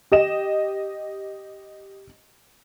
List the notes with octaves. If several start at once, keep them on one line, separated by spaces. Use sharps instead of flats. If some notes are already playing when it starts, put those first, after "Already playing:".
G4 D#5 E7